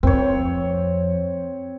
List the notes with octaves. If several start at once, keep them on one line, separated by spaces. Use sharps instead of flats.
F2 C4 C#5